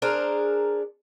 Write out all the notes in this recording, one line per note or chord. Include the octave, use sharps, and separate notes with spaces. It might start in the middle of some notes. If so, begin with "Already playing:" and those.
D4 G#4 A#4 C5